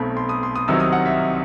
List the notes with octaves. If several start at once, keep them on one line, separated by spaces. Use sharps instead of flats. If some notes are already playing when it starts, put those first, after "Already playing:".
Already playing: B1 B2 A3 C4 B5
C6
D#6
C6
D#6
C2 C3 D#3 F#3 C4 E6
D#6
F#5
E5